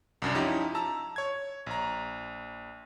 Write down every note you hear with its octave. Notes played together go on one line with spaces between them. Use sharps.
C2 F#2 D4
F3 C#4 D#4 E4 G4
A5 A#5 E6
C#5 G#6
A#1 A#5